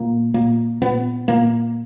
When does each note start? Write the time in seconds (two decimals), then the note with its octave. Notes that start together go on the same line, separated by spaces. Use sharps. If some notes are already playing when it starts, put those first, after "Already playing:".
Already playing: A#2 A#3
0.34 A#2 A#3
0.82 A#2 B3
1.28 A#2 A#3